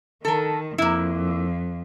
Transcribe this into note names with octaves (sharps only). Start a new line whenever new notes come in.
D#3 A4 A#4
F2 A#3 E4